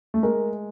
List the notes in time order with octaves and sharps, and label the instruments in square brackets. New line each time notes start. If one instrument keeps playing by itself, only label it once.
[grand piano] A3
[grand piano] G#3 [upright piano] A#4